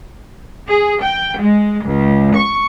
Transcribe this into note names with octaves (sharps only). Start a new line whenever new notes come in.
G#4
G5
G#3
C#2
C#6